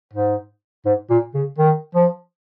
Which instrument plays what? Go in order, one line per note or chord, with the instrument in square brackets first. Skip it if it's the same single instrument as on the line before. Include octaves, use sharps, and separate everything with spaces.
[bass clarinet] G#2
G#2
A#2
C#3
D#3
F3